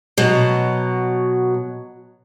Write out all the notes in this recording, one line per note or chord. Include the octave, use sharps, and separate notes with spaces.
B2 F#3